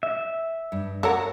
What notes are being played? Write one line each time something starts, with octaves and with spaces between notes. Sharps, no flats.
E5
G2
F#4 A4 A#4 C#5 F#5